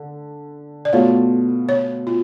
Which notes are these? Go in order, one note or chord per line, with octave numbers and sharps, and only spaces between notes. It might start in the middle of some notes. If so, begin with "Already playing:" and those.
Already playing: D3
D5
B2 A3 F4 C#5
C#5
F4